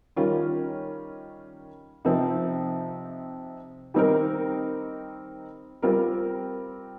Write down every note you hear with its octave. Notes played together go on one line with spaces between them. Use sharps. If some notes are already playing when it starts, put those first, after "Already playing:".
D#3 G3 C#4 F4 A#4
C3 F3 C4 D#4
D#3 G3 C4 D#4 A#4
G3 C4 F4 A#4